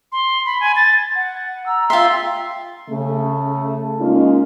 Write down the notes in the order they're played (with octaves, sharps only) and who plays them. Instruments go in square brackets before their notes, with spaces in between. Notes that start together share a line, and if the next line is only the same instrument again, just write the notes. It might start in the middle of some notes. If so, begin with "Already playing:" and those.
[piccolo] C6
B5
G#5
A6
F#5
[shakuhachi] A#5 [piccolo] E6
[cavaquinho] F4 E5 [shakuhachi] G5 [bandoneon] C6
[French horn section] C#3 A3
G#3 A#3 C#4 D#4 F4